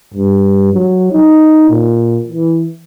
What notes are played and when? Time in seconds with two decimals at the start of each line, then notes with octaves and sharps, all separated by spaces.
0.14 G2
0.73 F#3
1.12 D#4
1.70 A#2
2.28 E3